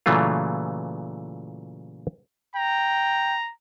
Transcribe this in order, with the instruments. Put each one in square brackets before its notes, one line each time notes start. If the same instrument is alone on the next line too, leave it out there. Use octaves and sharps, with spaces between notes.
[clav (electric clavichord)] A#2 C#3 E3 F#3 A3 F4
[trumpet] G5 [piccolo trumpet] A#5